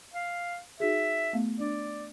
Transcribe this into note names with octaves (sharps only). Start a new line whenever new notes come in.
F5
D#4 F#4 G#4 E5
A3 B3 F5
D4 D5